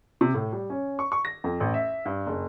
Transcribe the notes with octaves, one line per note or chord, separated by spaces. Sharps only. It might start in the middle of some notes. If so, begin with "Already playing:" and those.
C3
A2
G3
C#4
C#6
C#6
A#6
F2
A1
E5
G2
F#1